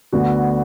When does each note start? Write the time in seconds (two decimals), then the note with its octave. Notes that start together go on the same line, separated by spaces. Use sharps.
0.12 D2 D3 B3 F#4